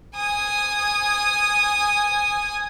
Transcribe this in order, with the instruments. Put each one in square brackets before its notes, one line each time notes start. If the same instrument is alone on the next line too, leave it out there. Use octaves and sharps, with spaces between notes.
[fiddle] G#5 D#6